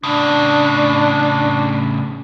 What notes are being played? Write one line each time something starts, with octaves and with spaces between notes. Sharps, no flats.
A2 C#3 D4